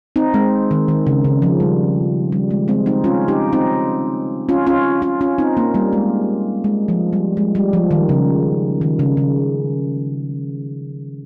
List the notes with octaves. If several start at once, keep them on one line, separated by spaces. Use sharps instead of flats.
C4 D#4
G#3 C4
D#3
D#3
C#3
C#3
F3
G3
G3
G#3
G#3 C4
C4 D#4
C#4 F4
D#4 G4
C4 D#4
C#4 F4
C#4 F4
C#4 F4
C#4 F4
C4 D#4
A#3 C#4
G3 A#3
G#3
G#3
F3
G3
G#3
G3
F3
D#3
C#3
D#3
C#3
C#3